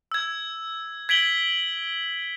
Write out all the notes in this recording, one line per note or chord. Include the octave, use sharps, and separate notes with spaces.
E6 G#6
G#6 B6 D7 F#7 G7